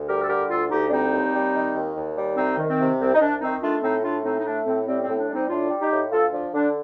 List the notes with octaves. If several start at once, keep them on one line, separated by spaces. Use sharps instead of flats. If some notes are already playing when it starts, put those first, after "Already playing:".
Already playing: D2
G3 G4 A#4
A4
D3 G4 A#4
D2 F4 A4
D2 D#4 G4
D4
G3 C4 D#4
D#2
G3
D#3
D#2
D#2
G3
C2 C4 D#4
D#3
C4
C3
C2 C4
D#4
C2 D4
D#3 C4 D#4
A3 D4 F4
A2 C4 D#4
A3 D4 F4
A2 C4 D#4
D#4
A3 D4
A2 C4
G3 C4
C4
A2
D4
G3
C4 D#4
A2 D4 F4
G3
D#4 G4
A2
D2 F4 A4
F3 D4 F4
D3 D4